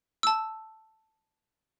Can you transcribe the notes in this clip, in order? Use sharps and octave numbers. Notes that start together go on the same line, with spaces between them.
A5 E6